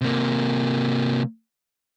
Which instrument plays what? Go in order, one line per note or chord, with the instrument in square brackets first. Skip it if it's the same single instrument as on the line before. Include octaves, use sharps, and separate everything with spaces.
[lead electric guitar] C3 A#3